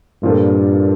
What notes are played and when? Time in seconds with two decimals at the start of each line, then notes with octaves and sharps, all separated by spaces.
0.22 G2 A#2 F3 C4 F4 A4